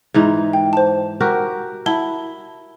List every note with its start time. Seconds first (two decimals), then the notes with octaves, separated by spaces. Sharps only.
0.14 G#2 E3 D#4
0.53 G5
0.73 C5 A5
1.20 F#4 G4 A#4
1.86 E4 F#5 A5 G7